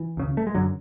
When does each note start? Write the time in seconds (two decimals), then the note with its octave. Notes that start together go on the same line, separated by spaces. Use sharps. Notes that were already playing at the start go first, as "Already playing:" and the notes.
Already playing: E3
0.17 D2 C#3
0.37 A3
0.47 G#3
0.55 F#2 D3 F#3